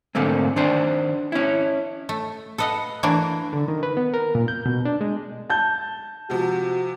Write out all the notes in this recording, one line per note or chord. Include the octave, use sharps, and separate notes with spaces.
G#2 D3 A3 A#3 C4
D#3 D4 C5
C#4 E4
A3
A4 B4 D#5 F5 F#5
E3 A3 A#3 D4
D3
D#3
B4
B3
A#4
A#2
G6
B2
D4
G#3
A5 G6
C3 F3 G#3 F#4